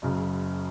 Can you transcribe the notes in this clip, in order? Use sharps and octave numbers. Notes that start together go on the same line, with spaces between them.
F#1 F#2 C#3